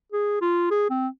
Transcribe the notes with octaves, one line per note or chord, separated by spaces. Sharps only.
G#4
F4
G#4
C4